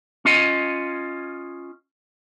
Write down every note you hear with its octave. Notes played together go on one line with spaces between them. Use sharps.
C#4 F4 D#5